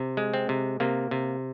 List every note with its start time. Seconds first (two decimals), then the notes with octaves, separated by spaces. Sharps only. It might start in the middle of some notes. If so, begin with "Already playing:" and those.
Already playing: C3
0.17 G#3
0.34 C4
0.49 C3
0.80 C3 A#3
1.11 C3